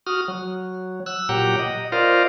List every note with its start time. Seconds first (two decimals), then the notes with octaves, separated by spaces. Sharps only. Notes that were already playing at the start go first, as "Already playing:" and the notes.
0.06 F#4 D#6 F6
0.28 F#3
1.06 E6 F#6
1.29 A#2 F#3 G4 F#5 G5 A#5
1.59 D#5
1.92 F4 A#4 C5 D5 D#5 F5